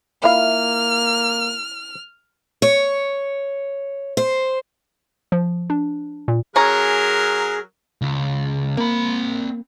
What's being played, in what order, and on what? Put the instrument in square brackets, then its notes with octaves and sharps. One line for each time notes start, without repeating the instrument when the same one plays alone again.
[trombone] A#3 [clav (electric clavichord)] E4 [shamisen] F4 F5 [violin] F6
[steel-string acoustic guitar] C#5
C5
[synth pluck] F3
D4
A#2
[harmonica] F#3 A#4 [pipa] C#4 A#5 [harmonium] G#4
[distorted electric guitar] C#2
[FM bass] A#3 [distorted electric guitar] C4 B5